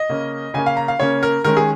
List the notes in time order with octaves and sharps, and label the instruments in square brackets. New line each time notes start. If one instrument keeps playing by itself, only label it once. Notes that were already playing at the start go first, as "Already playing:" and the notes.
Already playing: [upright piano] D#5
C#3 A#3 C#4
C#3 A#3 C#4 G#5
F5
A#5
F5
C#3 A#3 C#4 C#5
A#4
D#3 G#3 C#4 A#4
G#4